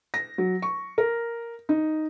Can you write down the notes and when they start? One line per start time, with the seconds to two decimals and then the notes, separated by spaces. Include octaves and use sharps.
0.14 A#6
0.38 F#3
0.62 C#6
0.98 A#4
1.69 D#4